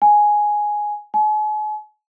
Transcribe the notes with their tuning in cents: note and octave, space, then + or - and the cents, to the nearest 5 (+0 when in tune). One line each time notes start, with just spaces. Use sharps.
G#5 +5
G#5 +40